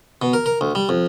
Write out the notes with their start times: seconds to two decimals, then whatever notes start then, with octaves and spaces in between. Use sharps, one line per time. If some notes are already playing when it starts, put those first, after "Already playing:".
0.22 B2
0.33 A#4
0.46 A#4
0.61 D2
0.75 G3
0.89 F2